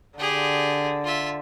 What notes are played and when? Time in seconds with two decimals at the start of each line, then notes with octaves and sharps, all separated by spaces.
0.19 D3 G4 G#4
1.04 F4 E5